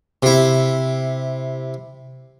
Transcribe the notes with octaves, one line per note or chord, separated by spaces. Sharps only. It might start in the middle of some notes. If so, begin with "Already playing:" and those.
C3 E4